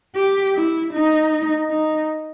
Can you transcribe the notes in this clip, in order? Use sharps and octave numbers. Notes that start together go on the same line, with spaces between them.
G4
E4
D#4
D#4